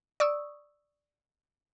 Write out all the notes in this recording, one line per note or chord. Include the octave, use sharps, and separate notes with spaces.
D5 C#6 D#6 E6